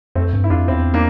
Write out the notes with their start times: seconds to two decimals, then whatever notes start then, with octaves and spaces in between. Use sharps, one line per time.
0.15 F2 A3 C4
0.33 G2
0.44 E4
0.50 F2 D4 F4
0.68 E2 C4 E4
0.94 A#3 D4